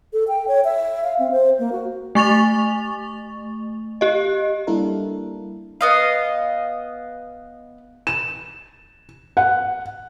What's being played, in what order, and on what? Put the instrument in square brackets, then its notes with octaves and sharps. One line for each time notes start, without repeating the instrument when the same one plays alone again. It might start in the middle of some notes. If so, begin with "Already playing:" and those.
[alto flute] A4
G5
C#5
E5
F5
C4
C5
A#3
F#4
[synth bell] A3 C#6 A6 F7
G4 D#5
[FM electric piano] G3 A#3 D4 E4 A4 A#4
[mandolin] B3 D#5 F5
[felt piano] E7
F#5